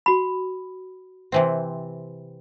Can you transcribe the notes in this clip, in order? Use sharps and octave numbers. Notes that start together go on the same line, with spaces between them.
F#4 B5
C3 E3 C4